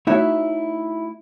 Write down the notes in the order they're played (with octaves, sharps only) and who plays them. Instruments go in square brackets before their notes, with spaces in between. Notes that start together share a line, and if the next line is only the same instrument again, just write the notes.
[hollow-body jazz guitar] A3 D#4 E4 F#4 C#5 E5